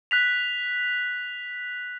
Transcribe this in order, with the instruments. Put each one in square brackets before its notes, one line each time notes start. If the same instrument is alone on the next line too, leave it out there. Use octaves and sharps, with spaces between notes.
[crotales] F#6 B6 F7